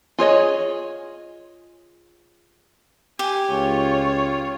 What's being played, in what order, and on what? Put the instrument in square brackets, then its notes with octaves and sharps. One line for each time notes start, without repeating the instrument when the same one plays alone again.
[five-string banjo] F4 G#4 C#5 D#5
[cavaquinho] G4 [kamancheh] G#5
[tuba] C#2 [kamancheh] F4 C#5